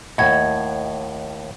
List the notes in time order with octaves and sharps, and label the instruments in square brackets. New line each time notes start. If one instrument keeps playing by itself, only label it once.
[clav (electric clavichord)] D#2 A2 [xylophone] D#5 F#5 G#6